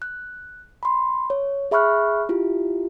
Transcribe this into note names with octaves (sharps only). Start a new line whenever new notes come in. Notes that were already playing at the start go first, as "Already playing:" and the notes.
F#6
B5 C6
C#5
G#4 E5 B5 C#6 F6 F#6
E4 F4 G4